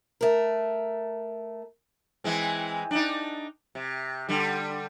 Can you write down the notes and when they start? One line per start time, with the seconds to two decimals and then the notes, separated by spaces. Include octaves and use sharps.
0.21 A3 A#4
2.24 E3 G#3 C4
2.91 D4 D#4
3.75 C3
4.29 D3 G3